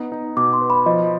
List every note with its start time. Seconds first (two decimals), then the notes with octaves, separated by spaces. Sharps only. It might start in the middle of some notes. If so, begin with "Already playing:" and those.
Already playing: B3 D#4
0.12 D#4
0.37 B2 D6
0.53 C6
0.61 B4
0.70 B5
0.86 F3 D#5